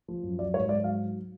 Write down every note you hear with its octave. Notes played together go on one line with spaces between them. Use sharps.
F3
F#2
F#3 D5
G#2 C#5
G#2 D5
F#3 F5